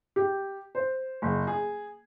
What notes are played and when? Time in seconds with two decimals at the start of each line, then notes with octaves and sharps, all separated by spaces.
0.16 G4
0.75 C5
1.22 F#1
1.47 G#4